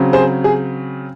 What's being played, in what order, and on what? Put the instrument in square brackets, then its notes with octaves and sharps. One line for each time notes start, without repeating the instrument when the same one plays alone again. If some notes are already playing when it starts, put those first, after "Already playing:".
Already playing: [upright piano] C#3 F#3 C4
G#4 C5
G#4